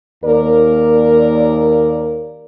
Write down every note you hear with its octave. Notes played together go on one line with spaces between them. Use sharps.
D#2 A#3 A#4 D5